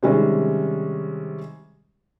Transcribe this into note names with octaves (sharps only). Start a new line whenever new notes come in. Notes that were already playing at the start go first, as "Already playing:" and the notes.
C3 D#3 G3 G#3 C#4